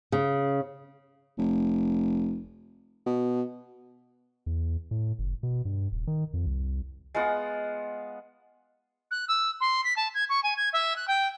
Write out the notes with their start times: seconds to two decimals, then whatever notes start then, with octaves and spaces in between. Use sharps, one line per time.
0.12 C#3
1.38 F1
3.06 B2
4.46 E2
4.91 A2
5.19 F#1
5.43 B2
5.65 G2
5.92 D#1
6.07 D#3
6.34 F2
6.46 C2
7.14 G#3 B3 F4 F#5
9.11 F#6
9.28 E6
9.60 C6
9.84 B6
9.96 A5
10.14 G#6
10.29 C#6
10.43 G#5
10.56 G#6
10.73 E5
10.96 F#6
11.07 G5